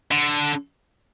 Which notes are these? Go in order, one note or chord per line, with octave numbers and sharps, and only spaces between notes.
D3